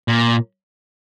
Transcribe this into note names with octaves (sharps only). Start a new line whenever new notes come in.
A#2